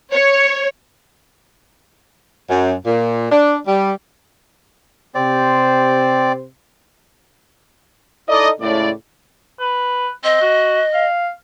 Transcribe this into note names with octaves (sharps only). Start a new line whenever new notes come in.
C#5
F#2
A#2
D4
G3
C3 C4 G4 C5 D5
D#4 E4 A4 D5 D#5
C#2 A2 D5
B4
C4 D#5
F#4
F5